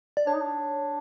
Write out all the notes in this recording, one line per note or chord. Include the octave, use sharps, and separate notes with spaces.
D5
D4 C#5
D#4
D4